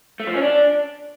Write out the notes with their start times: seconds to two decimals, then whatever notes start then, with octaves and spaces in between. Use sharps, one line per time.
0.20 A3
0.27 F3
0.34 C#4
0.42 D4